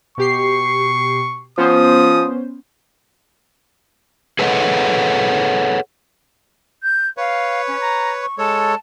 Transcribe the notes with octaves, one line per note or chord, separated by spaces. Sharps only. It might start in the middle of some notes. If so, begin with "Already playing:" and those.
B2 G4 C#6 C7
F3 B3 C#4 C5 D#6
G#4 A4 B4 C#5 D#5 F#5
G6
B4 C#5 F5
C#4
A#5
C#6
G#3 A4 C#5 A5